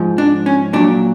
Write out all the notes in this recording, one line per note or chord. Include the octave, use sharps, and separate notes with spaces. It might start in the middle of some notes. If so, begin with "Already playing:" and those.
Already playing: G#2 F3
D4
C#4
A#2 F#3 D4